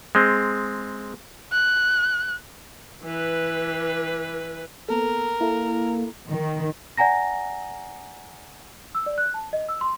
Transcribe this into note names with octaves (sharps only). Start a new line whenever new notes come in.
G#3 C4
F#6
E3 B4
A#3 B3 A4 A#4
A#3 E4 A4
D#3
D5 F#5 G#5 A#5 A#6
E6
D5
F#6
A5
D#5
E6
C6